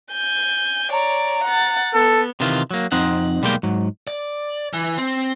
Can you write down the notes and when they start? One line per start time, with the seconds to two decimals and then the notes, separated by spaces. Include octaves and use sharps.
0.12 G#5 G6
0.92 C#5 D5 A#5
1.44 F#5 A6
1.94 B3 A4
2.40 C3 D#3 E3 F4
2.71 F#3 A#3
2.92 F2 C4 D#4 F#5
3.42 B1 G3 G#3 A#3 G5
3.63 G#2 F#3
4.07 D5
4.73 E3
4.98 C4